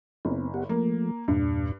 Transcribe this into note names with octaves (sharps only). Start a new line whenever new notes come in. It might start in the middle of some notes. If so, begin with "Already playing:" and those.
F#1 B3 C4
B3 G4 F#5
F3 A3 A#3
E2 G2 A#2 D4